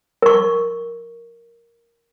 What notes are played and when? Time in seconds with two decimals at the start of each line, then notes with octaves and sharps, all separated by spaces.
0.22 A#4 C#6